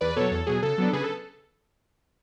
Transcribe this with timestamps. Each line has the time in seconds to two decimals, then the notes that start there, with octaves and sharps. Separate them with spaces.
0.01 E2 B4 D5
0.16 B2 F#3 A4 C#5
0.31 E2 A4
0.47 B2 F#3 G#4
0.63 C#3 A4
0.78 F#3 B3 D4
0.93 C#3 G#4 B4
1.04 A4